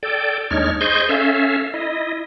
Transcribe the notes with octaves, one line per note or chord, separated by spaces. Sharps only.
A4 D5 G5
D#2 G#3 D4 D#4 C#5 F6
G#4 C5 D#5 C6 C#6 G6
C#4 A4 E5 F5
E4 D#5